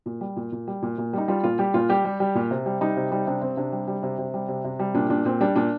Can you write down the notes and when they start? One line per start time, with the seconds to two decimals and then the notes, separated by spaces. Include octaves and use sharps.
0.06 A#2
0.21 G3
0.36 A#2
0.52 A#2
0.67 G3
0.82 A#2
0.98 A#2
1.13 G3 D#4
1.28 G3 F4
1.43 A#2 F4
1.59 G3 G4
1.74 A#2 F4
1.89 G3 G4
2.05 G3
2.20 G3
2.35 A#2
2.51 C3
2.66 G3
2.81 G3 D#4
2.97 C3
3.11 G3 D#4
3.27 C3 D4
3.41 C3 C4
3.57 C3 D4
3.73 G3
3.87 G3
4.03 C3
4.18 C3
4.34 G3
4.48 C3
4.64 C3
4.79 G3
4.94 A#2 D4
5.09 A#2 D4
5.25 A#2 C4
5.40 G3 D4
5.55 A#2 D4